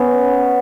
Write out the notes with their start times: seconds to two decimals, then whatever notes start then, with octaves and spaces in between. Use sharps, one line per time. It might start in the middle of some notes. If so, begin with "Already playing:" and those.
Already playing: B3 C#4